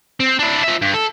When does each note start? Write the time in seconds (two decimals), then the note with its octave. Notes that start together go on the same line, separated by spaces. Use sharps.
0.20 C4
0.39 D4 E4
0.64 F3 E5
0.82 G2
0.94 A4